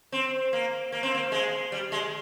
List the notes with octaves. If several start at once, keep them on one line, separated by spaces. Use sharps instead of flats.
C4
A#3
A#3
C4
A#3
G#3
G3
G#3